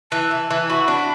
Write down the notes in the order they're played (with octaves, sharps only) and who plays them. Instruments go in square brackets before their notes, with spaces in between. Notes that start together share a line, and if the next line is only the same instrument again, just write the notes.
[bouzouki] E3 [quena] A5
[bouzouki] E3
E3
[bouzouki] F#4 [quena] B5
[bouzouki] D4 [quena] B5